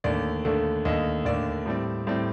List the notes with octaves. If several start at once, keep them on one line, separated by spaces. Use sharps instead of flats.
D#2 D3 A3 D5
D#2 D3 A3
D#2 D3 A3 D#5
D#2 D3 A3 D5
A2 G3 C4
A2 G3 C4